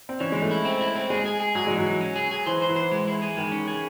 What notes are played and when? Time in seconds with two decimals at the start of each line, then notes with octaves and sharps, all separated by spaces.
0.09 C4
0.20 E3 C#4
0.32 E3 G#3
0.42 A3
0.51 E4
0.65 C4
0.81 E4
0.96 C4
1.10 G#3 G#4
1.26 G#4
1.40 G#4
1.55 F#3 G#4
1.67 E3 G#3
1.78 F#3
1.86 E3
2.01 C#4
2.16 G#4
2.31 G#4
2.46 E3 C5
2.62 C5
2.69 E3
2.76 C5
2.92 G#3
3.07 E4
3.22 G#4
3.37 D#3 G#3
3.52 C#4
3.68 G#4